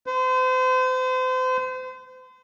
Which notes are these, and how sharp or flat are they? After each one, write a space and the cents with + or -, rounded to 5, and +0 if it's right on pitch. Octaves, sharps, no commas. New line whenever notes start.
C5 -35